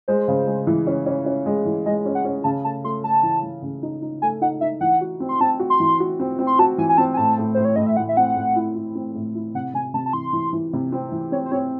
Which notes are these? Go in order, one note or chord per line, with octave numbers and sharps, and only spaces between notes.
G#3 C5
C#3
G#3
E3
C#4
C#4
C#4
G#3
E3
G#3 D#5
C#4
F#5
C#4
C#3 A5
A3 A5
A3 C6
A3 A5
E3
E3
C#3
D#4
D#4
A3 G#5
D#4 F#5
D#4 E5
E3 F#5
F#4
C4
C6
C4 A5
F#4
C6
E3
F#4
C4
C4
C6
F#4 A5
E3 G#5
G#5
C4 A5
G#5
A2 A5
A2
A2 C5
C#5
A2 D#5
E5
A2 F#5
E5
C4 F#5
A2
E4
E4
C4
A2
E4
C3 F#5
C3 G#5
C3 A5
A5
E3 C6
E3
E3
C3
C4
E3
C4 C#5
C5
C4 C#5